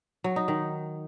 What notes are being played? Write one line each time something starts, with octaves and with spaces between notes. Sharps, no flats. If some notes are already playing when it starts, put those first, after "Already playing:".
F#3
D#4
D#3